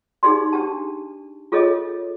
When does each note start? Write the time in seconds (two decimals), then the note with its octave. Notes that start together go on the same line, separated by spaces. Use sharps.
0.23 D#4 G4 G#4 D5 C6
0.53 D4 G4 A5
1.52 F4 G#4 A4 C#5 D#5